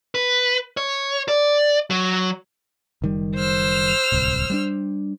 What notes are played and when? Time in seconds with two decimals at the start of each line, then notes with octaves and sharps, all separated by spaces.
0.15 B4
0.77 C#5
1.28 D5
1.90 F#3
3.02 F#1 D#3 G3
3.36 C5 E6 F6
4.12 D1 C2
4.50 G3 B3 D4